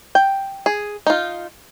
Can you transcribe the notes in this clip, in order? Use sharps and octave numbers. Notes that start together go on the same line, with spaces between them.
G5
G#4
D#4 F4